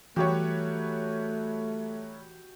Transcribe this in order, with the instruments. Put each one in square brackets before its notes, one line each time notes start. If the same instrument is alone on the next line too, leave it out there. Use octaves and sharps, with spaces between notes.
[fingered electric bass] E3 [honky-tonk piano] F#3 G3 C#5 [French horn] A3 [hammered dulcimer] F#4 G4